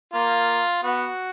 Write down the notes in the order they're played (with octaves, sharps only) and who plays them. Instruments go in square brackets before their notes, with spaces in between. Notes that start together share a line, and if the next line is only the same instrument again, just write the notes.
[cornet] A#3 [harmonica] F4
[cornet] B3 [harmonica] F#4